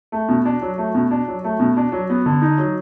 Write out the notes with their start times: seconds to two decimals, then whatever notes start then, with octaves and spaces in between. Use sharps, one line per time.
0.12 A3
0.29 B2
0.45 D4
0.62 F#3
0.78 A3
0.95 B2
1.11 D4
1.28 F#3
1.44 A3
1.60 B2
1.77 D4
1.92 F#3
2.10 B3
2.26 D3
2.41 D#4
2.58 F#3